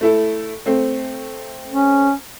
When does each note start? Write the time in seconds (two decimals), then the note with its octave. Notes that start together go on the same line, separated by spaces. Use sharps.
0.01 A3 E4 A4
0.66 A3 C4
1.69 C#4